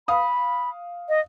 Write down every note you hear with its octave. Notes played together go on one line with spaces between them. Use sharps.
F5 B5 D#6
D#5